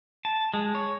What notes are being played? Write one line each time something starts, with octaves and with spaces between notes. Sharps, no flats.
A5
G#3
C#5